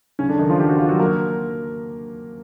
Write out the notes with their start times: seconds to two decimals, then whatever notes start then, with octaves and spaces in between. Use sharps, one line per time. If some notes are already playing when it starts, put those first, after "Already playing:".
0.19 C#3 C#4
0.29 D3 D4
0.39 D#3 D#4
0.49 F3 F4
0.59 G4
0.69 F#4
0.79 F4
0.88 F#3 F#4
1.00 A#3 A#4